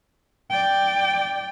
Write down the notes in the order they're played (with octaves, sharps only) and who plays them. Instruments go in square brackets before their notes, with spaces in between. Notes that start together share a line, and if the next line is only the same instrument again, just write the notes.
[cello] D5 G5